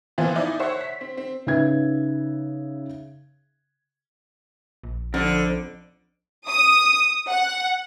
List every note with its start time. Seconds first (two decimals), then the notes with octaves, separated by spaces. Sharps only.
0.18 A#2 E3 F3 B3 C4 F4
0.36 D#4 E4 D5
0.60 C5 C#5 E5 F#5
0.81 B6
1.01 C4
1.17 C4
1.47 C#3 D#4 B4 E5 G#6
4.84 A#1
5.14 F2 D3
6.48 D#6
7.29 F#5